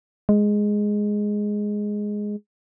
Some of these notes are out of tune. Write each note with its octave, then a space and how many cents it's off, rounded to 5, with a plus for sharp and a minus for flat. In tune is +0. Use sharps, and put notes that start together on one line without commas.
G#3 +0